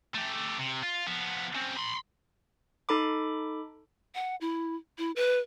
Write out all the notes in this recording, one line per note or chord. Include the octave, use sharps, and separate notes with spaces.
A3 G4
C3
F4
F3 B3
C#3 C4
B5 C6
D#4 A4 B5 D6
F#5
E4
E4
B4